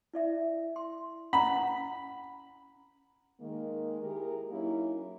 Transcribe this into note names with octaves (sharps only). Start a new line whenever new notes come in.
E4 D5 E5
C6
C#4 F#5 A#5 B5
D#3 G#3 A#3
E4 G4 G#4 A#4
F#3 A#3 C#4 D#4 E4